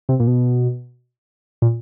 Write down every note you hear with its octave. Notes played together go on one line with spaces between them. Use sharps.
C3
A#2
B2
A#2